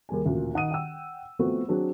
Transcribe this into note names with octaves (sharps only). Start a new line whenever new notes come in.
D#2 G3 G#4 G#5
A1 D2 A#2
D#3 F#5 D#6 D#7
F#5 G5 E6
F3 A3 B3 C4 F#4
F#3 C4 D4 G#4